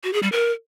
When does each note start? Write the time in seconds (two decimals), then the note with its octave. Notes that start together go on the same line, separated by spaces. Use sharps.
0.04 F#4
0.13 G#4
0.23 G3
0.32 A#4